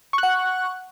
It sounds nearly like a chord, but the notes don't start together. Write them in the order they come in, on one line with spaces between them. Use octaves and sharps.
C#6 F#6 F#5